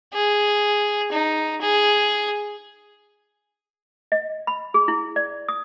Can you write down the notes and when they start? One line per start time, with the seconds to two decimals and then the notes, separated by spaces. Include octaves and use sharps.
0.14 G#4
1.12 D#4
1.61 G#4
4.12 D#5
4.47 B5
4.74 G#4
4.88 E4
5.16 D5
5.49 D#6